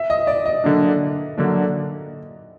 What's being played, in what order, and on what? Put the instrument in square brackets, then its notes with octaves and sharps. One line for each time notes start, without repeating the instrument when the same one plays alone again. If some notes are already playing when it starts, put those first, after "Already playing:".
Already playing: [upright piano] E5
D#5
D5
D#5
[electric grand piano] D3 F#3 A#3 D4
D3 F#3 A#3 D4